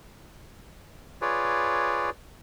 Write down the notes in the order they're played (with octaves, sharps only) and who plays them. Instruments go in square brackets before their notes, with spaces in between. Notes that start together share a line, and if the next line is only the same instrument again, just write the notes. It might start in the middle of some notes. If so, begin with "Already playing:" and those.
[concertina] F4 G#4 B4 C#5 D5